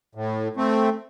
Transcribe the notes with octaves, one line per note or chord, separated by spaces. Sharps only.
A2
A3 C4